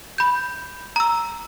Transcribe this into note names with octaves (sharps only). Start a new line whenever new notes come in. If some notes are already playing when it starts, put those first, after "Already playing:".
B5 G6
A#5 E6